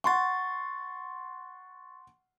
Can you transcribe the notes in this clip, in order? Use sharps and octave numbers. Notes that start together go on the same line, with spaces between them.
F#5 C6 C#6 A6